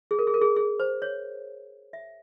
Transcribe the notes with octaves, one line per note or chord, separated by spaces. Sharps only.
G#4
A#4
G#4
A#4
G#4
G#4
C5
C#5
E5